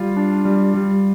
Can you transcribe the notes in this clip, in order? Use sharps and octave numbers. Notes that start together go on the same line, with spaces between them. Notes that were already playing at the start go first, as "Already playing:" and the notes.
Already playing: G3 F4
D4
G3
G3